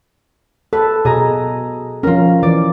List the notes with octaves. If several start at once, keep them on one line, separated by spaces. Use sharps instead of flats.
A4 B4
B2 G#4 D#5 A#5
F3 C#4 F4 A#4
E3 D5